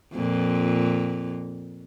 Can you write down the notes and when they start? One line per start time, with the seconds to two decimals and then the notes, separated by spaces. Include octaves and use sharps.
0.13 F2 A#2